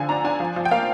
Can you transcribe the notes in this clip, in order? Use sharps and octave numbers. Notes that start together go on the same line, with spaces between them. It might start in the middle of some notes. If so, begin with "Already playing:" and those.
Already playing: D3 F3 G#5
D4 A#5
D4 G#5
F3
F3
G5
A#3 F5